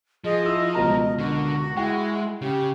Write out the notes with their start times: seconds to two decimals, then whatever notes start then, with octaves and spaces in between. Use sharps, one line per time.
0.24 F3 G#4 D#5
0.46 E4 E6
0.74 C#2 B2 A#4 A#5
1.18 D3 F#4
1.77 G#3 E4 F#5 G5
2.42 C#3 G4